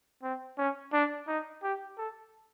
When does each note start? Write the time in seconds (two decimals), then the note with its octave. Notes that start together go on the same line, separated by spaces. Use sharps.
0.23 C4
0.58 C#4
0.93 D4
1.28 D#4
1.63 G4
1.98 A4